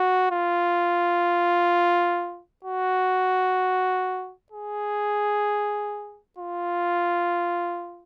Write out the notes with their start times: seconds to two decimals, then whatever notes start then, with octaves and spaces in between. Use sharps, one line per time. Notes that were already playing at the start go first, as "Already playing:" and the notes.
Already playing: F#4
0.31 F4
2.65 F#4
4.52 G#4
6.38 F4